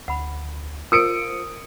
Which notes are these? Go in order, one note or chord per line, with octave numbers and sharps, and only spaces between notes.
D2 F#5 B5
F4 A#4 C5 D#6 C#7 D7